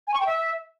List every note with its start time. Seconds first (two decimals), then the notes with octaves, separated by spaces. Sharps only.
0.07 G#5
0.14 C#6
0.20 G5
0.27 E5